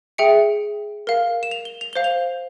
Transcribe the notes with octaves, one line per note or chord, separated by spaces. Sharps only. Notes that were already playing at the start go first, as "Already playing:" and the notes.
G#4 E5 G5 C#7
A#4 F5
E7
F7
G7
F7
C5 F5 G7
F7